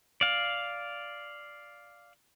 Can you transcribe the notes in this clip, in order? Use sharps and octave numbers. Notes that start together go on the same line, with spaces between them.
D5 F5